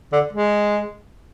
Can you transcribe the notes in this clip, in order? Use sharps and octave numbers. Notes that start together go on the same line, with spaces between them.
D3
G#3